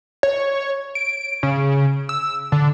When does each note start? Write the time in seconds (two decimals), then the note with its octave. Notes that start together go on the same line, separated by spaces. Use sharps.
0.23 C#5
0.95 D7
1.43 C#3
2.09 E6
2.52 D3